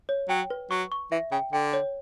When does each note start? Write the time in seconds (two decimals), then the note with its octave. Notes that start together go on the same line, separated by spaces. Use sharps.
0.09 C#5
0.29 F#3 G5
0.50 B4
0.71 F#3 C#6
0.92 C#6
1.11 E3 E5
1.32 C#3 G5
1.53 D3 G5
1.73 C#5